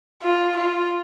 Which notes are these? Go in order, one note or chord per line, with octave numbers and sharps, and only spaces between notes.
F4
F4